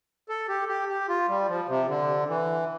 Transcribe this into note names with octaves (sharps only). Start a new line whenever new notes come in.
A4
G4
G4
G4
F4
G3
F3
C3
D3
E3